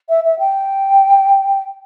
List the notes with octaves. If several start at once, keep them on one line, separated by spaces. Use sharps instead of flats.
E5
E5
G5